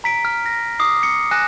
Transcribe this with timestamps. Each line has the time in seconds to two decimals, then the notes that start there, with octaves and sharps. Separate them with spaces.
0.04 A#5 B6 D7
0.25 F6
0.46 A#6
0.79 D6 D#6 C7
1.03 C#7
1.31 G#5 F#6 A#6 E7